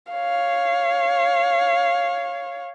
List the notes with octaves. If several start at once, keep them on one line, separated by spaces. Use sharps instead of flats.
C#5 F5